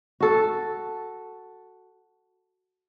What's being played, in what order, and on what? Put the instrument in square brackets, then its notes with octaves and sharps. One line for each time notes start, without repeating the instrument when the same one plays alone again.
[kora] F#4 A4